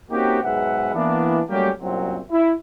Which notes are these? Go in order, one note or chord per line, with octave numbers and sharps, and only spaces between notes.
A#3 C4 C#4 D#4 F#4 G4
B1 G#2 G#4 B4 E5 F#5
E3 A#3 B3 D4
F#3 G3 A3 A#3 C#4 G4
C2 F#2 A#2 F#3 C4
E4